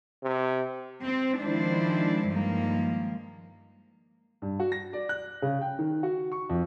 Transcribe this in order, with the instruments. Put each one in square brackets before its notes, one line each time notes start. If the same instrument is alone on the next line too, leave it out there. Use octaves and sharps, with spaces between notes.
[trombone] C3
[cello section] C4
D#3 F3 G#3 D4 E4 C5
G2 D#3 F3 G#3 A#3
[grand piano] G2
F#4
A#6
D5
F#6
C#3
G5
D#3
F#4
C#6
F2